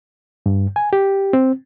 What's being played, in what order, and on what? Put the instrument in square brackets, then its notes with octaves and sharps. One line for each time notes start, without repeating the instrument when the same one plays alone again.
[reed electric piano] G2
G#5
G4
C4